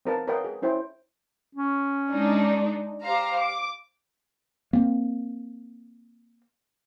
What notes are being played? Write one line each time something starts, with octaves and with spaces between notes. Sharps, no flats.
C4 D#4 A#4 B4 F5 A5
A#4 B4 C#5 D#5 F5 G5
G#4
C#4 E4 C5 C#5 G5
C#4
G#3 D4 D#4
G4 C5 F5 A#5
D6
A#3 C4